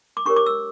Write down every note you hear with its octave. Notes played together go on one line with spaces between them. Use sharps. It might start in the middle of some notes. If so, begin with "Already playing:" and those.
D6
D4 G4 A#4 C#5 C#6
D6
E6